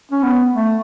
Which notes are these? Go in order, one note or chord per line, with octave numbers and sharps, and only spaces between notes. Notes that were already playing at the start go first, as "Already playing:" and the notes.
C#4
B3
A3